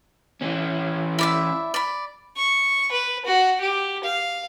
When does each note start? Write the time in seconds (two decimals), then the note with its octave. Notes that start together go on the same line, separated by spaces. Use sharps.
0.42 E3 C#4
1.19 E4 D5 E5
1.74 D5 B5
2.37 C#6
2.92 B4
3.26 F#4
3.60 G4
4.04 F5